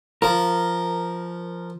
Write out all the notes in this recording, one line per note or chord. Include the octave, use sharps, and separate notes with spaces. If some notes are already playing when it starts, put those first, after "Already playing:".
F3 A#4